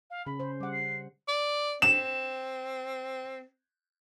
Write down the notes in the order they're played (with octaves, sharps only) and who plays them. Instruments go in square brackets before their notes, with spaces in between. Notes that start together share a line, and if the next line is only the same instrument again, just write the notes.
[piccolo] F5
[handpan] C#3 C#4 [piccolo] B5
[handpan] C#3 C5
[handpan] G3 F#5 [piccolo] D6
[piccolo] C7
[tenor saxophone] D5
[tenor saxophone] C4 [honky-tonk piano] E7